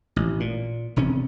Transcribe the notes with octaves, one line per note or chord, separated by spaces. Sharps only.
A1
A#2
E1 C3 C#4